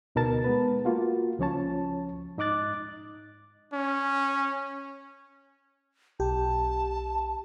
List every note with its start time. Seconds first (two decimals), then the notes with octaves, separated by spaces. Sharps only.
0.15 D2 B2 D#4 A#4 A5 A6
0.44 G#3 B3 B4
0.85 A#3 F4 F#4
1.39 C#2 F3 C#4 C#5 A5
2.38 G#2 D#4 D#5 D6 F#6 A6
3.73 C#4
6.20 B1 G4 A5